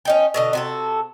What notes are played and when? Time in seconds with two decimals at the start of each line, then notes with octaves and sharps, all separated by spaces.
0.05 C#4 D#4 G5
0.34 B2 D3 D#5
0.53 C3 F#4 A4